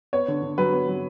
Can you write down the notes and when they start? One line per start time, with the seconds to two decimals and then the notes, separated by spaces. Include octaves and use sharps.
0.13 B3 C#5
0.28 D3
0.43 D3
0.58 F#3 B4
0.73 B3
0.88 F#3